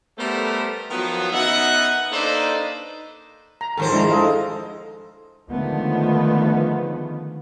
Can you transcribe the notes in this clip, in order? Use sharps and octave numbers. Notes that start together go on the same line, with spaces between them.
G3 A3 B3 A4 A#4 C5
D#3 F3 F#3 B3
F#2 B3 D#4 E5 F#5
A#3 D4 D#4 A4 B4 C5
A#5
F2 G#2 D#3 A4 C5
G#3 D4 E4 A#5
A4 D#5 F5
D3 D#3 F3 G#3 A3 B3